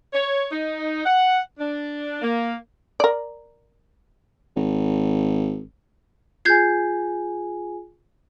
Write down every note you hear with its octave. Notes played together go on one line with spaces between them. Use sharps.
C#5
D#4
F#5
D4
A#3
A#4 D5
G#1
F4 G#4 G#5 G6 G#6 C7